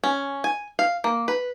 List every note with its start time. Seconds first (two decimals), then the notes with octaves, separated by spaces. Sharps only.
0.04 C#4
0.44 G#5
0.79 F5
1.04 A#3
1.28 B4